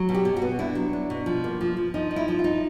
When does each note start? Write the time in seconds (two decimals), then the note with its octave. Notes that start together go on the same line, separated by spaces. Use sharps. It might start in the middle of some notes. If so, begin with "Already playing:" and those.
Already playing: F#3
0.09 B2
0.14 G4
0.25 B2
0.37 F#4
0.42 B3
0.59 D4 E4
0.75 F#3
0.93 D4
1.10 B2
1.26 F3
1.44 A#3
1.61 F3
1.77 F3
1.94 F3 D#4
2.11 D#4
2.16 E4
2.28 F3
2.39 F4
2.44 D#4